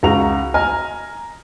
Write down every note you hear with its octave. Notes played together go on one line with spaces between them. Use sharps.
C#2 F#4 A#5 F7
D#5 G#5 A#5 F6